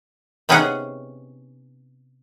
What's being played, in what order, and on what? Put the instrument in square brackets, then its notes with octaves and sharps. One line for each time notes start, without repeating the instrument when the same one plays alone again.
[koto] C3 B3 C#4 D#4 G#4 F#5